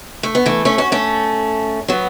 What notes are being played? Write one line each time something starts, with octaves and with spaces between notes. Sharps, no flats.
A3
B3
E3 A3
A3 C#4
C#4 F#4
A3 C#4
F#3 B3